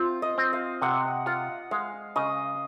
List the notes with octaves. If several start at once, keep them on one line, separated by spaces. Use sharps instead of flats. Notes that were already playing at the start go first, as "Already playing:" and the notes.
Already playing: C4 F4
D#5
C4
F5
C3 F#5
F4 F#5
G#3 F5
C#3 D#5